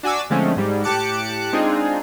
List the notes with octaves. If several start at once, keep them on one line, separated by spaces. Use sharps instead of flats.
D4 F#4 G#5 D6 E6
D3 F3 G#3 A3 C4 C#4
G#2 G3 G#3
A2 G4 A5 D6 F#6 C#7
G#3 C4 D4 D#4 F4 G#4